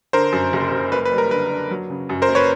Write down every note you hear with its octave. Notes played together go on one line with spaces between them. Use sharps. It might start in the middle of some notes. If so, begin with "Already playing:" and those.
D3 A#4 C5
F#2
F#1
F#1
A#3 B4
B4
G3
A#4
D3 B4
D4
F#3
C#3
F#2
A#4 C5
A#3
B4 C#5